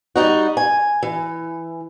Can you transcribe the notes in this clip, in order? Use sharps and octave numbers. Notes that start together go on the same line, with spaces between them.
G3 D#4 F#4
G#5
E3